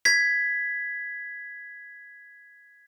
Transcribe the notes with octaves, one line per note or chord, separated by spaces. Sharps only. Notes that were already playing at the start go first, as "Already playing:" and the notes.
G#6 B6